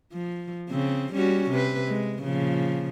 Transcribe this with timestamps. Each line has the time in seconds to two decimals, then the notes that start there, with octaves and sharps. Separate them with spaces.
0.13 F3
0.69 C#3 C4
1.13 G3 C#4 F#4
1.51 C3 B4
1.87 G#3
2.21 A#2 C#3 F3